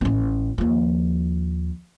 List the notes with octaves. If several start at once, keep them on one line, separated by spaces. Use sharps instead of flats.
A1 C#4
D#2 F3